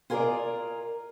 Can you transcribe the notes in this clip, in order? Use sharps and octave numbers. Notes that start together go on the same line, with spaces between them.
F4 G#4 A#4 B4 D5 D#5